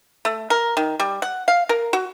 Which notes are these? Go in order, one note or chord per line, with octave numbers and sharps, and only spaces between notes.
A3
A#4
D#3
G3
F#5
F5
A#4
F#4